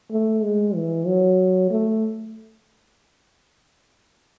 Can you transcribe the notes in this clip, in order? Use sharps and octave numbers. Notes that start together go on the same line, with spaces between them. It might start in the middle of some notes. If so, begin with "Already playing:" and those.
A3
G#3
E3
F#3
A3